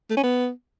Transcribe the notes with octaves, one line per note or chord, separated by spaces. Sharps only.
A3
C#4
B3